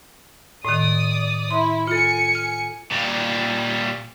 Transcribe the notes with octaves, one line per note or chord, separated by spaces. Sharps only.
A2 D#3 D5 D#6
E4 C6
F4 A4 G#5 C#7
F6
A#2 G3